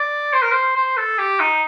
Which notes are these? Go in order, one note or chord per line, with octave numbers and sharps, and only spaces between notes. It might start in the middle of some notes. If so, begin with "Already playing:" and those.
Already playing: D5
C5
A#4
C5
C5
A4
G4
D#4